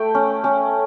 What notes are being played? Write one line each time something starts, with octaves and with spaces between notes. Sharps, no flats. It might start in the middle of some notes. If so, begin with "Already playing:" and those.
Already playing: A3 G5
C#4
C#4